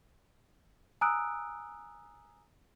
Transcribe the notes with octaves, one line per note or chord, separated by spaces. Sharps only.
G#5 A#5 D#6 E6 F#6 D7